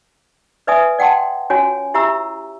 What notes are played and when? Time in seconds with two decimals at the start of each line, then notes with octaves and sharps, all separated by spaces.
0.67 B4 D5 E5 G#5 D#6
0.99 D5 F#5 G5 A5 C6
1.50 C#4 F4 F#4 C#5 G#5
1.94 E4 G4 E5 A#5 E6